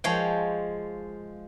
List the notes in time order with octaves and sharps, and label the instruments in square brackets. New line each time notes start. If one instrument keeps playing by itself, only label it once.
[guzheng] F3 G#3 C#5 F5 G5